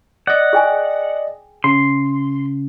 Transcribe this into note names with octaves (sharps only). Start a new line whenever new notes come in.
D5 D#5 F#5
G#4 G5 G#5
C#3 C6